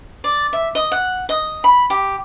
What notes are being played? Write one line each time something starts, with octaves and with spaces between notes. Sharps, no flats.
D5
E5
D#5
F#5
D#5
B5
G4